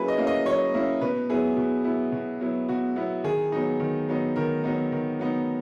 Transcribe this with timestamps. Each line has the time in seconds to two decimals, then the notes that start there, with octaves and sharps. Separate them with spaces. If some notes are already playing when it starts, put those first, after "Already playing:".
Already playing: F#3 A#3 C#4 E4 G#4 B4
0.08 D#5
0.17 A#3 C#4 E4
0.27 D#5
0.45 F#3 C#5
0.74 A#3 C#4 E4
1.01 B2 B4
1.30 F#3 B3 E4 G#4
1.57 B2
1.84 F#3 B3 E4
2.12 B2
2.41 F#3 B3 E4
2.69 B2 F#4
2.96 F#3 B3 E4
3.24 D#3 G#4
3.52 F#3 B3 D#4
3.80 D#3
4.09 F#3 B3 D#4
4.36 D#3 A#4
4.64 F#3 B3 D#4
4.92 D#3
5.19 F#3 B3 D#4